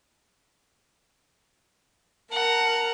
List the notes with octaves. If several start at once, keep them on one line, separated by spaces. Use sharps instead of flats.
A#4 F#5 A5 A#5